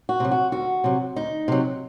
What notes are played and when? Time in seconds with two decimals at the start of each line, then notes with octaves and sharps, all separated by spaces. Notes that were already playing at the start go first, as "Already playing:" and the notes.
0.09 F#4
0.20 C3 F#3
0.31 F#4
0.52 D2 F#4
0.84 C3 F#3
1.16 D2 D#4
1.48 C3 F#3